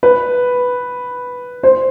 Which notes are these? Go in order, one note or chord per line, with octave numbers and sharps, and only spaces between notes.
B4
C5